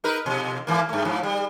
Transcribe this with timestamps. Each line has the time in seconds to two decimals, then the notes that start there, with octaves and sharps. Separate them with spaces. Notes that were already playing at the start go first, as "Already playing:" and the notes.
0.04 D#4 A#4 B4
0.26 F2 B2
0.67 G#2 E3 A#3
0.89 G2 A3
1.05 G#2 F3
1.23 G3